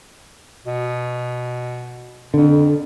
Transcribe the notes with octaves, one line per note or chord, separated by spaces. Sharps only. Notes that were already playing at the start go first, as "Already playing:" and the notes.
B2
F2 D3